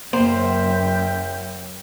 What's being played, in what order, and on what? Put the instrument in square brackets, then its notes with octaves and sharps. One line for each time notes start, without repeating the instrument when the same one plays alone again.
[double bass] F#1 F#2 [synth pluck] A#3 [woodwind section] A#4 E5 G5 [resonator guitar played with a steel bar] C5